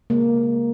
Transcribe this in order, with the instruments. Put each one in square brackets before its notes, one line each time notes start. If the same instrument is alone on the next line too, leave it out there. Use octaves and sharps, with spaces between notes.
[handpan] C#3 G#3 A#3